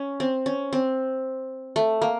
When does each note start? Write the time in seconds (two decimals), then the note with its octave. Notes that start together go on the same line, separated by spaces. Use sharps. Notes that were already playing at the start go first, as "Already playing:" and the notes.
Already playing: C#4
0.20 C4
0.46 C#4
0.73 C4
1.76 A3
2.02 A#3